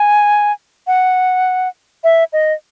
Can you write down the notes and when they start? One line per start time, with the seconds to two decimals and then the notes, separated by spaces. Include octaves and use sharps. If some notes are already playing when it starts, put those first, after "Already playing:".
Already playing: G#5
0.87 F#5
2.04 E5
2.33 D#5